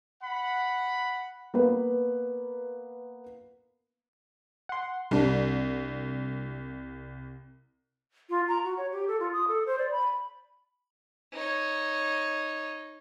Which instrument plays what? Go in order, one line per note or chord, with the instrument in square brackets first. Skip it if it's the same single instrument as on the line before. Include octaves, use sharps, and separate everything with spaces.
[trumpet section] F#5 B5
[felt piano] A#3 B3 B4
[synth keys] F#5 C6
[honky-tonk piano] C2 [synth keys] G3 D4
[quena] F4
A#5
F#4
C#5
G4
A4
F4
D#6
A4
C5
D5
B5
[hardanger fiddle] D#4 C#5